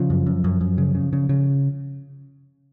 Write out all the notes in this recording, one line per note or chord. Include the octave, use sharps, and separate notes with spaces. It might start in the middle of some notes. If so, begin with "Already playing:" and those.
Already playing: C#3 F3
F#2
F#2
F#2
F#2
C#3
C#3
C#3
C#3